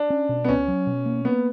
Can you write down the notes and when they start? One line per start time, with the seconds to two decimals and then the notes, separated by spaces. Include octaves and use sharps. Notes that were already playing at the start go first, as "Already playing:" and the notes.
Already playing: D4
0.10 C#4
0.29 B2
0.44 B3
0.49 C#2 C#4
0.68 F#3
0.87 B2
1.06 A#3
1.25 A#3 B3